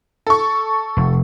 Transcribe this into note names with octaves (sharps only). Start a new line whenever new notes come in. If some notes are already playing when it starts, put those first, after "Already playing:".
A4 C#6
F1